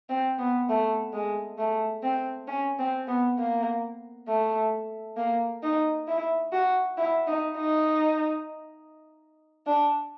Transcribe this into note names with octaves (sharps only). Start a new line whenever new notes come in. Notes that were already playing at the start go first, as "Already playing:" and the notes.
C4
B3
A3
G#3
A3
C4
C#4
C4
B3
A#3
A3
A#3
D#4
E4
F#4
E4
D#4
D#4
D4